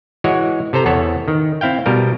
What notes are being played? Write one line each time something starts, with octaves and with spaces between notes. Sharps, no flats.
E3 G#3 F#4 C#5
C3 A4 C5 A#5
E2 B3 A4 C#5
D#3
C4 E4 F5 G5
B2 G3 A#4